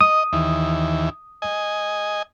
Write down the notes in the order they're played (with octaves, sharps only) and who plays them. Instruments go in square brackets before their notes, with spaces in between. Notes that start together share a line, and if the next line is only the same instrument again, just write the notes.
[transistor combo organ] D#5 [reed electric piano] D#6
[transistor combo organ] D#2 E3
D#5 G#5